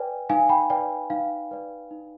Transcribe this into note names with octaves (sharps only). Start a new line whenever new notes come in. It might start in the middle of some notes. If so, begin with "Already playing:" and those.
Already playing: B4 D5 G5 G#5
D#4 F5 G#5
G5 B5
B4 D5 G5
D#4 F5
B4 D5
D#4